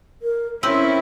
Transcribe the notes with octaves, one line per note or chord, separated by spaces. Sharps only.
A#4
C4 C#4 E4 B4 C#5